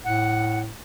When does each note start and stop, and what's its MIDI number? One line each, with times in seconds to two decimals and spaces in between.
0.05 0.72 45
0.05 0.60 78